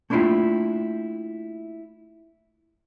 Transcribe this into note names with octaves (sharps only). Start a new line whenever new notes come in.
A3 A#3 D4 E4 F4 G4